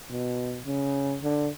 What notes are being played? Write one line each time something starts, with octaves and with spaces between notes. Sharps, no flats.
B2
C#3
D3